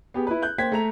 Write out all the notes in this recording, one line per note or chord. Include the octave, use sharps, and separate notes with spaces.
B3 G4 G#4
E4 B4
F#6 G6
A#3 C5 G5 G#6 B6
A3 A#5 F7